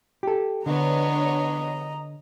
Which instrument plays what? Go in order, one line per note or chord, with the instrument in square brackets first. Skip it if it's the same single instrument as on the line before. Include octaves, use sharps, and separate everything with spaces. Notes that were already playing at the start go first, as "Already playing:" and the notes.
[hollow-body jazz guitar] G4 A4
[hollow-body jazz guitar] D3 [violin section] B3 D4 C#5 [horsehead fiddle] D#5 A#5